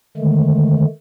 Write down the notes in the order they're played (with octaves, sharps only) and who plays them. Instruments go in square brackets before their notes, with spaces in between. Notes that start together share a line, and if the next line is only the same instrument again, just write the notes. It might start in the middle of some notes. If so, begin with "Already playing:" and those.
[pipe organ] D3 D#3 G#3 A3